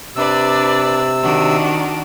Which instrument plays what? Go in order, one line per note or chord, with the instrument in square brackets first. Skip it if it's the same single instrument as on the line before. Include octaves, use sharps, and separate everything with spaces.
[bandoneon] C3 E6 [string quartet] D4 B4 D5
[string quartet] D#3 D4 F#4